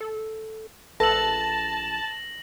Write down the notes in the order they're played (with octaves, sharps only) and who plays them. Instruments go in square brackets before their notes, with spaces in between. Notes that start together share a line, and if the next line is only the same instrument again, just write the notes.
[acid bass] A4
[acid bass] A#1 [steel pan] A4 B4 [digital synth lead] A5 [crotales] A#6 F#7